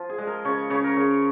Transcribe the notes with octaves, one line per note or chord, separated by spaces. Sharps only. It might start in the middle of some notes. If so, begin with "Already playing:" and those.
Already playing: F3 F4
G#4
G#3
A#4
C#3 C#5
C#3 C#5
A#4
C#3 A#4